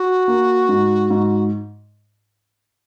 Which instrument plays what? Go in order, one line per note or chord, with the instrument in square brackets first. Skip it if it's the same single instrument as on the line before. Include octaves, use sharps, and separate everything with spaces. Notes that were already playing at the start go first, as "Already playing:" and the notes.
Already playing: [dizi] F#4
[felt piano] A#3
G#2
G#2